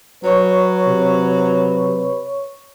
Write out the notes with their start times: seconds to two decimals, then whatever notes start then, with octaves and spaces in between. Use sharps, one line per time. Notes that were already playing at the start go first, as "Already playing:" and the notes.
0.24 F#3 B4 C#5 C#6
0.87 C3